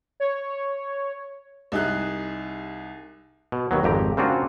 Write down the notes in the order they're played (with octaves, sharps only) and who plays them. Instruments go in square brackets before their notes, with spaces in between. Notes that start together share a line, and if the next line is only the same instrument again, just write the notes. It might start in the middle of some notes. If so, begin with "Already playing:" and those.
[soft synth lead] C#5
[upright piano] C2 D#4 G#4 F#6
[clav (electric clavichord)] B2
D#2 B2 F#3
G#1 F2 G4 A#5
C#3 A#3 C4 D4 F4 F#4